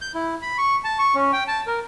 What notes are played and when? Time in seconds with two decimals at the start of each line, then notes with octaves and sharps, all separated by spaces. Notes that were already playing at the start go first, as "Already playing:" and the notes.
0.01 G6
0.14 E4
0.42 B5
0.58 C#6
0.84 A5
0.99 C#6
1.15 C#4
1.33 G5
1.48 A5
1.67 A#4